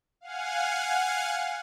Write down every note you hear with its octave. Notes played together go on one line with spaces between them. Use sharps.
F5 F#5 G#5